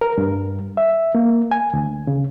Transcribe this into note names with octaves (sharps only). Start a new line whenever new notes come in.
A#4
G2
E5
A#3
G#5
D2
C#3